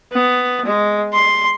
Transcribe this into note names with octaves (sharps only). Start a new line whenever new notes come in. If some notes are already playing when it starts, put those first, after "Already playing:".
B3
G#3
C6